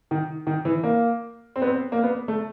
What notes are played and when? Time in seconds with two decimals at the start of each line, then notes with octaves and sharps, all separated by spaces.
0.11 D#3
0.47 D#3
0.65 E3
0.83 A#3
1.56 C4
1.62 B3
1.67 C4
1.92 A#3
2.03 B3
2.28 A3